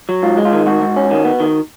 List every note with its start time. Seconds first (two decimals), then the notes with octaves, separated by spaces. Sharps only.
0.09 F#3
0.22 G#2 F4
0.37 G#3
0.45 F4
0.53 D#3
0.66 G#2 F#4
0.82 G#2
0.96 C#4
1.11 D#3
1.25 B3
1.40 D#3